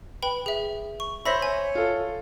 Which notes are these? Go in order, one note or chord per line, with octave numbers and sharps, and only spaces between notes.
B4 G5 B5
G#4 E5
C#6
C5 C#5 E5 B5 A#6 B6
G#5
F4 A4